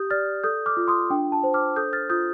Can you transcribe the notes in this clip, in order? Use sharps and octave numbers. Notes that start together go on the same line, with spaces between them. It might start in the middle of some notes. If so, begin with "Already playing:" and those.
Already playing: G4 D#6 G6
D5 F6 A6
A4 D#6 G6
D6 F6
F4
C6 D#6
D4 G5
A5
C5
D6 F6
A4 D#6 G6
F6 A6
F4 D#6 G6